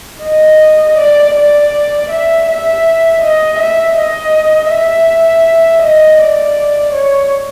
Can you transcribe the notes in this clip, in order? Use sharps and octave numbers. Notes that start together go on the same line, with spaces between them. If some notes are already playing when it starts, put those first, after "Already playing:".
D#5
D5
D5
E5
E5
D#5
E5
D#5
E5
D#5
D5
C#5